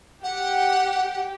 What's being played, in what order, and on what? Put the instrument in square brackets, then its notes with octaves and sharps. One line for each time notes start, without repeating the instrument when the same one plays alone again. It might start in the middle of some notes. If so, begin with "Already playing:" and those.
[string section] G4 [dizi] F#5